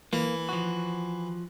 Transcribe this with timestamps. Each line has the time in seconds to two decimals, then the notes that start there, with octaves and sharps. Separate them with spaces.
0.13 E3 A#3
0.49 F3 F#4